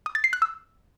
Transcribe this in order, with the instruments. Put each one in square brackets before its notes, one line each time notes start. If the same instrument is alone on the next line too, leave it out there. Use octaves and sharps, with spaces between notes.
[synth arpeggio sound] D#6
A6
C7
F#6
E6